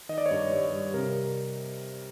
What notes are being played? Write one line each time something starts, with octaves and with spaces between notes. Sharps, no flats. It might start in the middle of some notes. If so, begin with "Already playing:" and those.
D#3 D#5
D5
C#5
G2 D5
G2
G3
C3 A#4